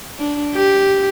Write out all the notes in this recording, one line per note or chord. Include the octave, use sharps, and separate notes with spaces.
D4
G4